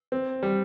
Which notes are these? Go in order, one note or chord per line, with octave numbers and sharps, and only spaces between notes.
C4
G3